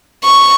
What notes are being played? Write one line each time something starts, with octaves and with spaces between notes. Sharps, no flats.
C#6